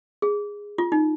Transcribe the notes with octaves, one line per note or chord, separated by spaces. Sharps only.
G#4
F4
D#4